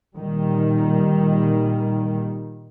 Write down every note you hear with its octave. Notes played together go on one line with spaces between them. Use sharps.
A#2 D#3 G3